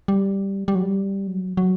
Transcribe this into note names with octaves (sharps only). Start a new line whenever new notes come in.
G3
G3
F#3
G3
F#3
F#3